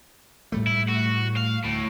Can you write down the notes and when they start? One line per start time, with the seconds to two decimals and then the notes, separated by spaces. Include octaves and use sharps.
0.52 A2 G3 A3
0.67 E4
0.89 F#4
1.36 F5
1.64 D2 A2